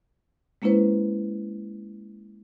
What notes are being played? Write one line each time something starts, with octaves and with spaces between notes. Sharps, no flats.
G#3 A#3 C#4 E4 B4 C5